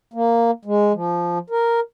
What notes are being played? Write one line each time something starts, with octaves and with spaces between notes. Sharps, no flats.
A#3
G#3
F3
A#4